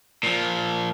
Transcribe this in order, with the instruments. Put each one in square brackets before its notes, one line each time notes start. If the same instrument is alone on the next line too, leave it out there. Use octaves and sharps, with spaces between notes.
[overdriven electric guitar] A#2 F3